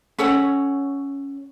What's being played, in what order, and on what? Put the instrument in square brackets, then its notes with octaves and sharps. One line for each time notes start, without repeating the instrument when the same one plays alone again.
[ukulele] C#4 A4 C#5 F#5